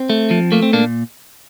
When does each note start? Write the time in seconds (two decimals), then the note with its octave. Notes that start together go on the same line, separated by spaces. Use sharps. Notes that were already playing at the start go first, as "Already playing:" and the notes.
Already playing: C4
0.10 A3
0.31 F3
0.52 A3 A#3
0.62 C4
0.73 A#2 A#3 D4